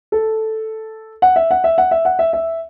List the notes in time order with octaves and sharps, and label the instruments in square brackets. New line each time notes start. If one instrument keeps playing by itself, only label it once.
[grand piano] A4
F#5
E5
F#5
E5
F#5
E5
F#5
E5
E5